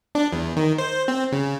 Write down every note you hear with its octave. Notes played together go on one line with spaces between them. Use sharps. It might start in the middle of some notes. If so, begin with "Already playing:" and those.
D4
E2
D#3
C5
C4
C#3